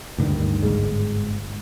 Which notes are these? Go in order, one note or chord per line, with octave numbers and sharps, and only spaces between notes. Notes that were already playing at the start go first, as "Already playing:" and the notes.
D2 G2 D#3
G1 C#2 G#2 G#3